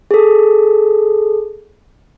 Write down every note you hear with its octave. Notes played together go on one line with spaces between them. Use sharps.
G#4 A4